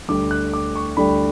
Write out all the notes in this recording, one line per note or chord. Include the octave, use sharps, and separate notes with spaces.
D2 D3 G3 D6
F#6
D6
C#6
D2 D3 G3 B5